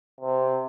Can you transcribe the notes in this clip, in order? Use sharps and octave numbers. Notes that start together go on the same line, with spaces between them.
C3